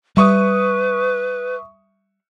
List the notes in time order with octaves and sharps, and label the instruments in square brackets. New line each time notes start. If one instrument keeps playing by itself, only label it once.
[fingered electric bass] G3 [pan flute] B4 [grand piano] E5 C#6 D#6